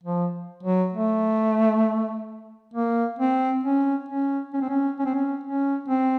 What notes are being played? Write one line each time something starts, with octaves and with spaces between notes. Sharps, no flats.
F3
F#3
A3
A#3
C4
C#4
C#4
C#4
C4
C#4
C#4
C4
C#4
C#4
C4